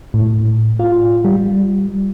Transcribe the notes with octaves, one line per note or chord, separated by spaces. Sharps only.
A2
F4
G3